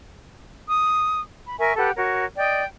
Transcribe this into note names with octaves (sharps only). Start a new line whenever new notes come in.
D#6
B5
A#4 E5 G#5 C#6
G4 A4 B4 F#5
F#4 A#4 C#5
D5 D#5 G5